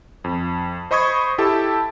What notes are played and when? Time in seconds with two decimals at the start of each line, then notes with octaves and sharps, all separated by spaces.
0.24 F2
0.91 C5 D#5 B5 C#6 D#6 G#6
1.38 E4 G4 A4 A5